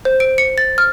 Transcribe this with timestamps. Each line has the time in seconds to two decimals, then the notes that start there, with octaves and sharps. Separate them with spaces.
0.05 C5
0.20 D7
0.38 C#7
0.58 A6
0.78 F6